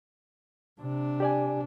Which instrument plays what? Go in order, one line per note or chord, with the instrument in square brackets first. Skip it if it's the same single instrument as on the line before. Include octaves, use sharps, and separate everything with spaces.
[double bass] C3 D4
[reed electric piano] G4 D5 G#5